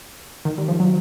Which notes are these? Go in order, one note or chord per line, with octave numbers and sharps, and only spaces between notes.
D#3
G3
F3
F#3